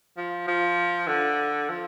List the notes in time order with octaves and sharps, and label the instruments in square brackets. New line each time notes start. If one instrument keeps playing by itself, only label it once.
[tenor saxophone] F3
F3
D3
F3